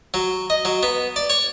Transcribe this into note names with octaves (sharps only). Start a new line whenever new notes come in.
F#3
D#5
F#3
B3
D5
C#5